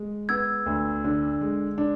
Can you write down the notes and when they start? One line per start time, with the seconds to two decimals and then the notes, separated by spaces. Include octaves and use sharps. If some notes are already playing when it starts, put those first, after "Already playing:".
Already playing: G#3
0.29 B3 E6 G#6
0.66 D2
1.04 D3
1.41 G#3
1.78 D4